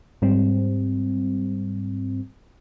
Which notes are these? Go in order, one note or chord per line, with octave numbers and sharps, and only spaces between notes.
G#2 G3 C4